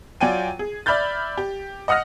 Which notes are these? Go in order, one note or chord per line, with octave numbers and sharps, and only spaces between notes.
F#3 F4 D5 G5 G#5 D#7
G#4
D5 E5 B5 F6 G6 A6
G4
D#5 F#5 D#6 F6 A#6